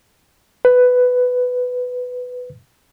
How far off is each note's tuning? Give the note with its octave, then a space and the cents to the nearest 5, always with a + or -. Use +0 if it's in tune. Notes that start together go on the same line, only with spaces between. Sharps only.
B4 +10